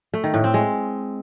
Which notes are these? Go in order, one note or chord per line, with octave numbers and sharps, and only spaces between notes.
A3
D#3
A2
C4
G#3